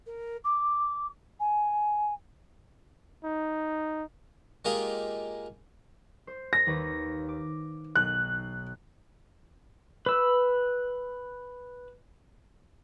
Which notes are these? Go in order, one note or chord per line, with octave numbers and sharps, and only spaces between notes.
A#4
D6
G#5
D#4
G#3 A#3 D#4 F4 G4 G#4
C5
A#6
D#2 B4 C#5
D6
B1 F#6
B4 E6